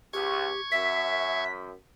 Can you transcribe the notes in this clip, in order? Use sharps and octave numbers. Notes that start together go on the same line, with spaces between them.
C#2 G4 C#6 G#6
F#2 E5 B6